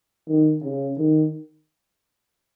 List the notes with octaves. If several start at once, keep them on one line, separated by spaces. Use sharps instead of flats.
D#3
C#3
D#3